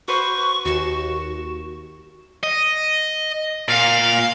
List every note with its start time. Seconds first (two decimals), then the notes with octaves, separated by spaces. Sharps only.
0.08 F#4 B4 C5 C#6
0.65 D#2 F#4 C#6 E7
2.44 D#5
3.68 A#2 F5